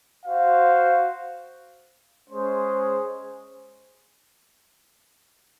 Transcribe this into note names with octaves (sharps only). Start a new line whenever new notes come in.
F#4 C5 F5
G#3 C#4 G#4 C5